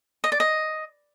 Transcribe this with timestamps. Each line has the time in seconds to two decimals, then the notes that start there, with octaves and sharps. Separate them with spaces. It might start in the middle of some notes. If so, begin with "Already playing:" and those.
0.24 D#5
0.32 D5
0.40 D#5